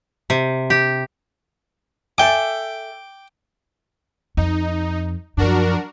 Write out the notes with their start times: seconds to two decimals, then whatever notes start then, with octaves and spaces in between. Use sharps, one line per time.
0.30 C3
0.70 G4
2.18 A4 E5 G5 G#5 D6
4.37 F2 D#4
5.37 F#2 F3 D4 F#4 A#4